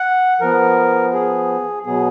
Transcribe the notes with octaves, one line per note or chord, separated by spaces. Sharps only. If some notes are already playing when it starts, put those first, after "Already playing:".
Already playing: F#5
F3 B3 A#4
G#4
B2 F#3 B3 G#4